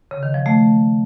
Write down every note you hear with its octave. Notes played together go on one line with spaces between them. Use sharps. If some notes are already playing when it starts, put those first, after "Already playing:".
C#3
D#3
F3
A3